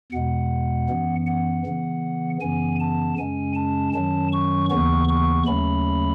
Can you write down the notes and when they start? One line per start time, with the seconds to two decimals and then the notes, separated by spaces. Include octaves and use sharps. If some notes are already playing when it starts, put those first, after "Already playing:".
0.12 E2 B2 G#3 F#5
0.88 F#2 E3 B3
1.27 F#5
1.65 C#3 E3 B3
2.41 F#2 C#3 E3 B3 G#5
2.80 A5
3.18 F#2 C#3 G#3 C#4 G#5
3.55 A5
3.94 F#2 D#3 F#3 C#4 A5
4.33 C#6
4.70 D#2 C#3 E3 B3 C#6
5.09 C#6
5.46 D#2 C#3 F#3 A3 C#4 B5